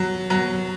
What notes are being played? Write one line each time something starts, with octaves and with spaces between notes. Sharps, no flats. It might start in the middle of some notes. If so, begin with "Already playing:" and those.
Already playing: F#3
F#3